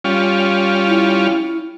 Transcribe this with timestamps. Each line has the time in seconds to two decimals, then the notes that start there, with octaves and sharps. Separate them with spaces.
0.04 G3 C#4 F4
0.87 E4